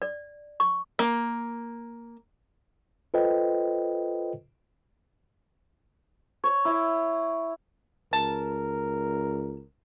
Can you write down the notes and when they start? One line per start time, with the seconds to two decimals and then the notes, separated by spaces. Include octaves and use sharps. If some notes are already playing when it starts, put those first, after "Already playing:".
0.02 D5
0.60 C#6
0.99 A#3
3.14 F4 A4 B4 C5 D#5 G5
6.44 C#5
6.65 E4
8.13 C#2 A#4 A5